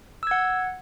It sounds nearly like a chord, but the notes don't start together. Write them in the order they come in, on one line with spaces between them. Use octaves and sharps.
E6 G#6 F#5